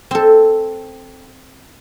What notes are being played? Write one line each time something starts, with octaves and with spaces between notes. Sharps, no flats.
C4 A4